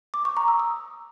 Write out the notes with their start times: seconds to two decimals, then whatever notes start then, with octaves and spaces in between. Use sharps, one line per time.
0.14 D6
0.25 C#6
0.37 A#5
0.48 E6
0.60 D#6